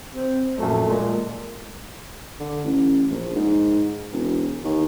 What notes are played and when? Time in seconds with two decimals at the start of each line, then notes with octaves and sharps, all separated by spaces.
0.14 C4
0.58 A#1 F#2 A3
0.89 A#2 G#3
2.40 D3
2.64 A1
3.11 A#1
3.35 G#2
4.12 E1
4.65 D#2